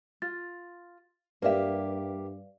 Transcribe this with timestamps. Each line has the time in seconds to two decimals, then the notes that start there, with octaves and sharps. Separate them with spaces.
0.22 F4 A6
1.42 G2 A#3 G4 A#4 B4 D5 E5 F5